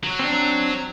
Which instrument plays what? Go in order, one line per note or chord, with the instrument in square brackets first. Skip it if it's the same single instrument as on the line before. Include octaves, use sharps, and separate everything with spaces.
[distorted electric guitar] F#3
[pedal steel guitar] C4 D4